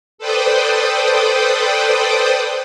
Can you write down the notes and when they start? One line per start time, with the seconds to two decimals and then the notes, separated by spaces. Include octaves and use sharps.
0.18 A4 B4 C5 D5 G5 D#6